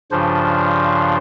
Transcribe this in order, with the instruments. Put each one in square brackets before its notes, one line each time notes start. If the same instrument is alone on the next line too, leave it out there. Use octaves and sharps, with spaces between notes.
[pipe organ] G2 C#3 F3 D4 F4 C5